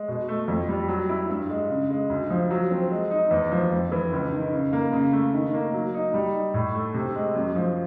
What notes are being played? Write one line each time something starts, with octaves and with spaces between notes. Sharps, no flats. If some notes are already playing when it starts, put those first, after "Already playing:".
Already playing: G#3
B2
A3
F2
G3
F#3
E4
G2
G#3
C#3
G#3
D2
F3
F#3
C4
G#3
D#4
E2
F3
F2
E3
C#2
D#3
C#3
A#3
C#3
A3
D#3
A#3
F#3
D#4
G3
D#4
A2
A3
C3
G#3
F#2
F3